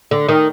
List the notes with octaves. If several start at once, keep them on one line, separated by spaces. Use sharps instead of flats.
D3
D#3